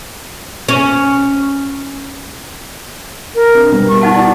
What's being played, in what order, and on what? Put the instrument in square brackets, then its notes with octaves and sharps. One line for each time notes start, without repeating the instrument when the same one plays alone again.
[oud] C#4
[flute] A#4
[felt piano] C4 D4
B2 G3 B3
[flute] C#6
[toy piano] D#4 F#5 A5 [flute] F#4
[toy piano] E4 [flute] D5